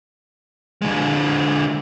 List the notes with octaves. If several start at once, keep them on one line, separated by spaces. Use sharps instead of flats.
D3 G#3